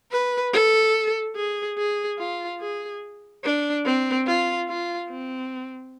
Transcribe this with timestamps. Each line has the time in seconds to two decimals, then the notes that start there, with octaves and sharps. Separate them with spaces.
0.12 B4
0.53 A4
1.36 G#4
1.78 G#4
2.19 F4
2.61 G#4
3.44 D4
3.85 C4
4.26 F4
4.68 F4
5.10 C4